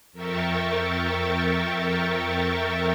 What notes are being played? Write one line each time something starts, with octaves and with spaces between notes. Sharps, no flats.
F2 A#4 E5 G5 C#6 A6